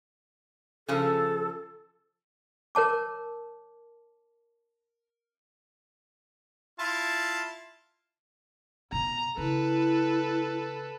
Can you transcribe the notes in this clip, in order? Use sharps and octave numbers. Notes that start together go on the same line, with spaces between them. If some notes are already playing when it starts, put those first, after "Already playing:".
C#3 F3 A4
A#4 C#5 A5 D6
E4 F4 A5
B2 A#5
C#3 E4 A4 B4